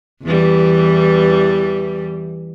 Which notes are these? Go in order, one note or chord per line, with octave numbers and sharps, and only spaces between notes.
E2 E3 G3